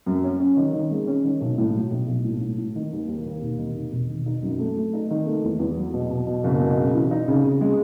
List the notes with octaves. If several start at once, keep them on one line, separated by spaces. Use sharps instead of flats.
F#2
C#4
C#4
D#3
D#3
G#3
C#4
D#3
B1
A2
F#3
B1
B1
A2
A2
A2
D#3
D#2
D#2
D#2
E1
D#3
E1
E1
D#3
D#4
F#2
A3
A3
D#4
D#3
A3
E2
E2
F#3
B2
B2
B2
F#1
B2
C#3
E3
D#4
C#3
C#3
G#3